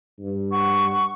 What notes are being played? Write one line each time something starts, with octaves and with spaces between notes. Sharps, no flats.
G2
F#5 C#6